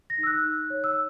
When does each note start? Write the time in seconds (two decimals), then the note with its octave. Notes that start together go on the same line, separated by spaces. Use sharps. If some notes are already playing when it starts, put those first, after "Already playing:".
0.10 A#6
0.18 D#4
0.23 E6
0.27 F#6
0.45 D#4
0.70 C#5
0.84 E6